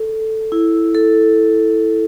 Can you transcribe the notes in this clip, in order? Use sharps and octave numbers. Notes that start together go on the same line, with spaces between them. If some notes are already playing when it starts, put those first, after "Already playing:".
Already playing: A4
E4
A4